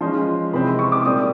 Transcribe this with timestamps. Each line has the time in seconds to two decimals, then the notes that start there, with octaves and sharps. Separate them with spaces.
0.01 F3 G#3 C#4 C6
0.53 C3 E3 G#3 C4 B5
0.66 C6
0.79 C#6
0.92 D6
1.05 A#2 G3 C4 D#6